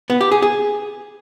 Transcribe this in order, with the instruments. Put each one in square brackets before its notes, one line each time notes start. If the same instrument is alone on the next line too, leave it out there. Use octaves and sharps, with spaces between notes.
[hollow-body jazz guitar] B3
G4
G#4
G#4